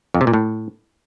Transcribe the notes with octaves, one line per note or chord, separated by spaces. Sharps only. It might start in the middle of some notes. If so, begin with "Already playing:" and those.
F2
C3
A#2
A2